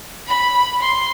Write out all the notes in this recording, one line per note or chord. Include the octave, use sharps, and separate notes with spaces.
B5
C6